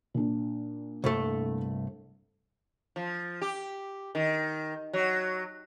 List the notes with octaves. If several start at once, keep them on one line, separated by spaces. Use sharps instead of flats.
A#2 D4
C2 G2 A3
F3
G4
D#3
F#3